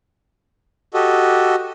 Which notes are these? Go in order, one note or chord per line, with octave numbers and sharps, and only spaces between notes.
F#4 G4 A4 D#5